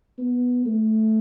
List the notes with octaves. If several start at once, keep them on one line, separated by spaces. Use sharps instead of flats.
B3
A3